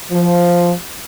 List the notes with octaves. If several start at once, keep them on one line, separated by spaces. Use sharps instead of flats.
F3